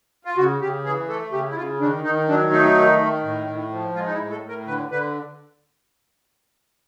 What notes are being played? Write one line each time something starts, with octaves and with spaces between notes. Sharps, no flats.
F4
C#3 F#4
C#3 G4
E3 G#4
A3 A4
C#3 G4
E4
C#3 F4
D#3 D4
D#3 D#4
F#3 D4
A3 D#4
D#3
D#3
A2
A2
F3
G#3 F4
D#4
E4
A2
A4
A2
A#4
D3 B4
D3 B4